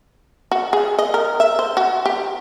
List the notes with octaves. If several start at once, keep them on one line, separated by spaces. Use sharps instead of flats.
F#4
G#4
D#5
A#4
E5
C5
F#4
G4